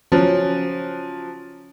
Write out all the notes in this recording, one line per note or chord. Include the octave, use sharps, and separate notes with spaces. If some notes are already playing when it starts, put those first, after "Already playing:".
F3 F#3 C#4